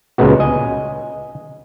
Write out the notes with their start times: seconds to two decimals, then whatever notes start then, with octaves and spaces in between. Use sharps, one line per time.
0.18 C#2 A#2 C#3 G#3 B3 F#4
0.40 D#5 G#5